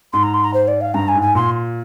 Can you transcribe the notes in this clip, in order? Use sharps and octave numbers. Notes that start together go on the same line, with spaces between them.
G#2 C6
A#5
C6
A#5
C5
D5
F5
G2 A#5
G#5
G#2
G#5
A#2 C6